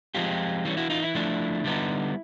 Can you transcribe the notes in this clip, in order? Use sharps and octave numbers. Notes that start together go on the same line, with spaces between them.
F3 G#3 C4 F4 G4
E3 G3 A#3 C#4
E4 F#4
D#4 F4
E4
F3 A3 D4
D3 G3 B3 D#4